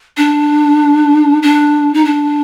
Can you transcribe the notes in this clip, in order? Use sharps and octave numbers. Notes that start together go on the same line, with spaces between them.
D4
D4
D#4
D4